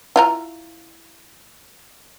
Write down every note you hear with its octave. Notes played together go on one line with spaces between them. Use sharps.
E4 F4 A#5